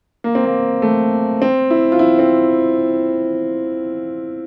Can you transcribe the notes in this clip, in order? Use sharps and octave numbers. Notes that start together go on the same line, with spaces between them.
A#3
C4
A#3
A3
C4
E4
F4
E4
C4